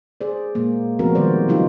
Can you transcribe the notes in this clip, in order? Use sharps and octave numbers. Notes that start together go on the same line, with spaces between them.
G#4 C5 D5
A#2 G#3 A#3
F3 A3 B3 C4 F#4 A#4
D#3 G3 G#3 C5 D5
C#3 F#3 D#4 F4 G4